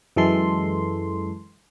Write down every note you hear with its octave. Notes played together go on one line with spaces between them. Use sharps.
F#2 E3 G#3 A4 C6